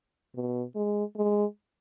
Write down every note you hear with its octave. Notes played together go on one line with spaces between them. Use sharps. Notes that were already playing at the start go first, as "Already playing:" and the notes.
B2
G#3
G#3